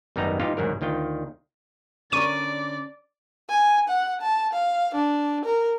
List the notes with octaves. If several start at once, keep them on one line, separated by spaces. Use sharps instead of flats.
G#1 F#2 G3 B3 D#4 A#5
G#2 E3 D#4 F4 G4 F5
D2 G#2 D#3 F#3 A#4
D2 D#3 F4 G5
D3 C#4 A#4 D5 C#6 D#7
G#5
F#5
A5
F5
D4
A#4